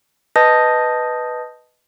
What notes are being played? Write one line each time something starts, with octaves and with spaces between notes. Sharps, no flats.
B4 D#5 A5 D#6 G6 A#6